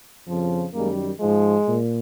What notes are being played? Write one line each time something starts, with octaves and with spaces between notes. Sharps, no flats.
F2 C#3 F3
F#2 D#3 G3 G#3 A#3
G#2 F3 G#3
A#2